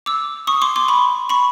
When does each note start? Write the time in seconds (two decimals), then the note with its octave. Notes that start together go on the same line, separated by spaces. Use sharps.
0.06 D6 E6
0.47 C#6 D#6
0.62 C6 D6
0.76 C6 D6
0.88 B5 C#6
1.29 B5 C#6